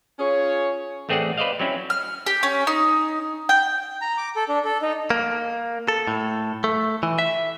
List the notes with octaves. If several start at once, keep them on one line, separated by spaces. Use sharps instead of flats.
C#4 F4 G#4 C#5
A1 A3 C4 G#4 D5 F#5
B4 C5 D5 D#5 F5
F#3 C4 C#4 E4
F6
G4
C#4
D#4
G5
A#5
D6
A4
D4
A4
D#4
A#3
A4
A2
A3
E3
E5